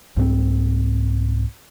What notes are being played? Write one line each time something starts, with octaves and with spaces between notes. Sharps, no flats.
C2 G#2 G3 C4